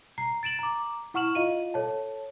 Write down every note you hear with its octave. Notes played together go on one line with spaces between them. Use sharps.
A#5 C7
A6 D7 E7 F#7
A#5 D6
E4 F#5 C#6 F6 E7 F#7
F4 D#5 F5 D#7
A4 C#5 A5